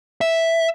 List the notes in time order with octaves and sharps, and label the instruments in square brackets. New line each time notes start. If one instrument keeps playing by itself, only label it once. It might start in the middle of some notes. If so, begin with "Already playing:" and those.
[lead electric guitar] E5